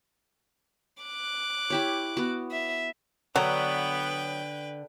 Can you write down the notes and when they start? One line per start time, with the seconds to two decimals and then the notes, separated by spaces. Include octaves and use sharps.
1.03 D6 F#6
1.70 E4 G4 C#5
2.17 B3 F#4
2.51 E5
3.36 D3 F#3 B3 B4 G5